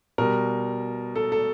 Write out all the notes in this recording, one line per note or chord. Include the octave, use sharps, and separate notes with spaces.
B2 G3 A#4
A4
A4